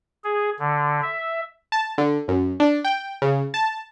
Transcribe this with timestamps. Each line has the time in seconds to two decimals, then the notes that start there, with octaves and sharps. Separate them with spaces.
0.24 G#4
0.59 D3
1.03 E5
1.72 A5
1.98 D3
2.28 F#2
2.60 D4
2.84 G5
3.22 C#3
3.54 A5